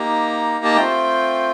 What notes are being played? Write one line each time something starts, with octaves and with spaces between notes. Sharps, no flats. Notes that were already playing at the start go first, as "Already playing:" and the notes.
Already playing: A#3 D#4 G4 A#5
A5
A3 C4 F4 G5